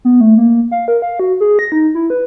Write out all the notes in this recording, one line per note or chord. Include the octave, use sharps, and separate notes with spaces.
B3
A3
A#3
F5
A#4
F5
F#4
G#4
A#6
D#4
E4
B4